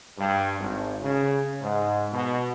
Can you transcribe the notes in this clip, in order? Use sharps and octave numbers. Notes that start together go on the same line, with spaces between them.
G2
G#1
C#3
G#2
B2